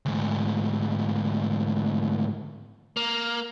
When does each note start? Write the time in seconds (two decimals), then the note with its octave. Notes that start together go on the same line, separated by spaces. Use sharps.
0.06 D2 G#2
2.97 A#3